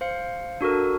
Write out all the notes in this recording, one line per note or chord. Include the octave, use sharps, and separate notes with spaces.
C5 F5 C#7
D4 F#4 A4 A#4